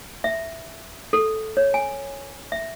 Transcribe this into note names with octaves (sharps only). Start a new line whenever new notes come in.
E5
A4
C#5
G#5
E5